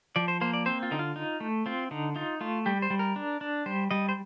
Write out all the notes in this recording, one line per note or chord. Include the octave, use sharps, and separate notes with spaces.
F3 D5
C5
A#3 C5
D5
C4 C5
F4
D3 D#4
F4
D#4
A3
C4 F4
D3 D#4
D#4 F4
A3 F4
G3 G4
C5
G3
A#4
D4
D4
G3 C5
G3 D#5
C5